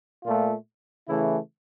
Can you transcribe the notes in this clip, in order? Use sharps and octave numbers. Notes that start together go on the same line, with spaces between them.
A#2 A3 F4
C#3 E3 A3 E4